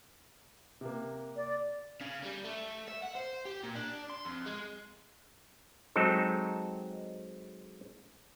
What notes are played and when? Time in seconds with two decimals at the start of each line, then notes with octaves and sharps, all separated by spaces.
0.81 C3 A#3
1.36 D5
2.01 C#3
2.23 G3
2.44 A3
2.88 E5
3.02 F#5
3.15 C5
3.45 G4
3.63 A#2
3.75 D4
4.10 C6
4.25 F2
4.46 G#3
5.96 F#3 G#3 C4 D#4 A4